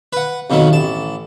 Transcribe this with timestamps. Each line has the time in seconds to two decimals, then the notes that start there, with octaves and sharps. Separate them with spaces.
0.13 B4 F#5
0.50 F2 B2 D#3 F#3
0.70 A1 A5